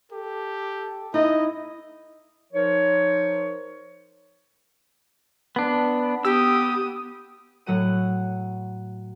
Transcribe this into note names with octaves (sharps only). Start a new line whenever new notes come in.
G4 A4
D#4 E4 D#5
F3 D#4 A#4 C5 C#5
B3 D4
B3 G4 D#6 E6
A2 F#3 F#5 D#7